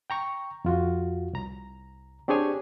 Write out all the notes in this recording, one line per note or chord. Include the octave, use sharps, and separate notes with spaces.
G5 A#5 C#6
F2 F4 F#4
C2 A#5
C4 D4 G4 G#4 C#5 G#5